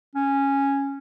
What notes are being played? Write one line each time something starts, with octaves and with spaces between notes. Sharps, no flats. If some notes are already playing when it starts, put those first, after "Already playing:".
C#4